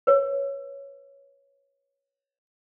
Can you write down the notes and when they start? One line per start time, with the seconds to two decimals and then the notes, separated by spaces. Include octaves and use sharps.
0.07 B4 C#5